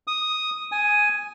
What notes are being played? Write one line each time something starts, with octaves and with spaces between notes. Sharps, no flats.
D#6
G#5